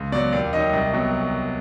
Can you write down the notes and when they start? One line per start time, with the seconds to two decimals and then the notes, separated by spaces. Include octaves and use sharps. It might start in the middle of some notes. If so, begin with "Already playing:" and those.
Already playing: C#2
0.12 B2 F#3 D5
0.32 D#2 D5
0.53 D#3 F#3 D#5
0.73 C2
0.94 B2 F#3